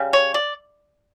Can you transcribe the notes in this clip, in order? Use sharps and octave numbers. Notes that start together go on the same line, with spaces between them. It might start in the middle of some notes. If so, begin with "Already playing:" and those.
Already playing: C#3 G3
C#5
D5